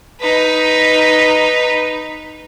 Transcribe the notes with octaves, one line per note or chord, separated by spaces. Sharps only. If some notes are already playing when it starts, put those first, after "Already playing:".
D#4 B4